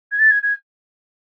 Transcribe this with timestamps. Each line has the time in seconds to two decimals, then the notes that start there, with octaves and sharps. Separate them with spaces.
0.12 G#6
0.19 A6
0.31 G#6
0.43 G#6